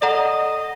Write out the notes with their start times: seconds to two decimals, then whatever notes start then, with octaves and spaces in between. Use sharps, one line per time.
0.01 A4 D5 D#5 F#5 A#5